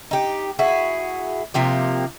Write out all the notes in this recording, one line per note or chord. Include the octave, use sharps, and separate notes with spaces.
D#4 G4
E4 F#4 G#4
C3 F3 A#3 G4